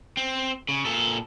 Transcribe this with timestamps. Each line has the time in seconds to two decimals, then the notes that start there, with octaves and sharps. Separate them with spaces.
0.17 C4
0.69 C#3
0.86 A#2 A4